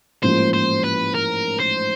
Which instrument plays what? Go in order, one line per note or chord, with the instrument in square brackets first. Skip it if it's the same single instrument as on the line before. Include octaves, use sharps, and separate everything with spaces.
[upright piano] A1 G#2 F3 A#3 C#4 [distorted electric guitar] C5
[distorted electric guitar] C5
B4
A#4
C5